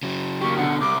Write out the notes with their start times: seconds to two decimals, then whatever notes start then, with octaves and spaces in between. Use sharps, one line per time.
0.03 C#3 F#3
0.42 A#3 G4 C#6
0.57 B2 D3 F#5
0.80 C2 D6